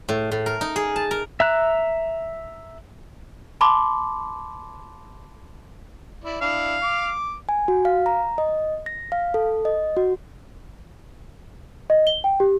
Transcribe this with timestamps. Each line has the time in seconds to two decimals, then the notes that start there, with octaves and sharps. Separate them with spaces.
0.09 A2
0.31 A2
0.46 A#4
0.61 D#4
0.76 G#4
0.96 A5
1.11 A#4
1.40 E5 A#5 F#6
3.61 A5 B5 C6 D6
6.24 E4 D5
6.41 D4 E4 F5
6.83 D6
7.49 G#5
7.68 F#4
7.85 F5
8.06 A#5
8.38 D#5
8.86 A#6
9.12 F5
9.34 A4
9.65 D#5
9.97 F#4
11.90 D#5
12.07 G7
12.24 G5
12.40 G4